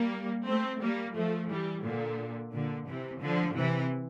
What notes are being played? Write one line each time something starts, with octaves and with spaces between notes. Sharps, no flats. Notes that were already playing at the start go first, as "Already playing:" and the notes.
Already playing: G3 A#3
A3 C4
G3 A#3
F3 A3
E3 G3
A#2 D3
A#2 D3
C3 E3
D3 F3
C3 E3